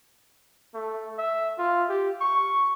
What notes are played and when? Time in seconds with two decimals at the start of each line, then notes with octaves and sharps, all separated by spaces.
0.74 A3
1.18 E5
1.58 F4
1.89 G4
2.21 C#6